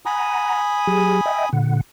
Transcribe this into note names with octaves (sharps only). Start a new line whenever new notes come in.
F#5 G#5 A#5 B5 D#6
F#3 G4 G#4
D#5 E5 G5
A#2 D3 F#5